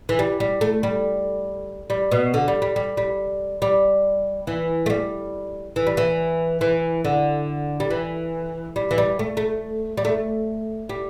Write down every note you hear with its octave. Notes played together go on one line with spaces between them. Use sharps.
E3
G3
G3
A3
G3
G3
B2
D3
G3
G3
G3
G3
G3
E3
A3
G3
E3
G3
E3
E3
D3
G3
E3
G3
E3
G3
A3
A3
G3
A3
G3